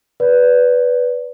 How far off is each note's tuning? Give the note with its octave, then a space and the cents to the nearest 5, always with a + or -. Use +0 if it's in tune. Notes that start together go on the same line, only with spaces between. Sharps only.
B4 +0 D5 -20